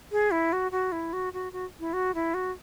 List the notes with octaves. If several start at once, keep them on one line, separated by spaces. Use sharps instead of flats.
G#4
E4
F#4
F#4
E4
F#4
F#4
F#4
E4
F#4
E4
F#4